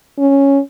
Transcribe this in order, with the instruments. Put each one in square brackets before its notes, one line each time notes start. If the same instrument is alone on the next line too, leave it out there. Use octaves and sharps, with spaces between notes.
[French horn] C#4